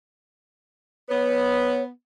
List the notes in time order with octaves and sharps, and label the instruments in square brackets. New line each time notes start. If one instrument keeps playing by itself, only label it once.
[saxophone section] B3 [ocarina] C#5